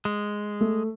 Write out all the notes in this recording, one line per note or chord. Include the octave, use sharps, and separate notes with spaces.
G#3
A3